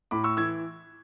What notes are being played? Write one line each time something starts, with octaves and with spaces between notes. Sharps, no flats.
A2 B5 D6
C#6 E6
E3 E6 G#6